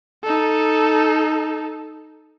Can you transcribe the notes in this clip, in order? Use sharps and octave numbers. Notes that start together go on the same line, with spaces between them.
D#4 A4